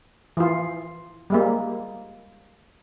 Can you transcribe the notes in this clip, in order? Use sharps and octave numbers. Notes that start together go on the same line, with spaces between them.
E3 F4
G3 G#3 A#3